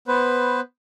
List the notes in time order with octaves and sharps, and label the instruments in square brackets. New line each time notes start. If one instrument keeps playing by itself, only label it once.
[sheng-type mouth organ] B3 B4 C5